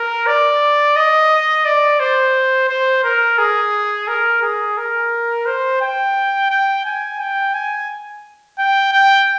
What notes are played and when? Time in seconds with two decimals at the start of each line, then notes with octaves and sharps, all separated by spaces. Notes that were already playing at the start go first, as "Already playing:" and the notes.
Already playing: A#4
0.27 D5
0.96 D#5
1.65 D5
2.00 C5
2.69 C5
3.04 A#4
3.38 G#4
4.08 A#4
4.42 G#4
4.77 A#4
5.46 C5
5.81 G5
6.50 G5
6.85 G#5
7.20 G5
7.54 G#5
8.58 G5
8.93 G5